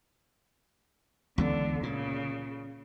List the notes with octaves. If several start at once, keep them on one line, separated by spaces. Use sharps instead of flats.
C#2 D3 E3 B3
A#2 C#3